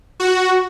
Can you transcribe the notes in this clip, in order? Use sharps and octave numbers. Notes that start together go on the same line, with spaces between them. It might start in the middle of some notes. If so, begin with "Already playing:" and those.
F#4